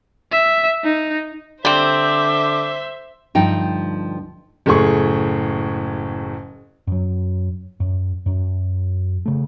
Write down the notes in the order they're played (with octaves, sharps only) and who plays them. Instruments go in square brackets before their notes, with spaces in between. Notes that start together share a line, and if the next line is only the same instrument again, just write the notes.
[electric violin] E5
D#4
[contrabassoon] D3 [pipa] G3 C4 [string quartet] C5 E5 [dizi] D6
[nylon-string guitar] D2 G2 F3 D#4 G5
[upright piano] F#1 A2 G#4 C#6
[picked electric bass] F#2 F#3
F#2
F#2
C#3 A3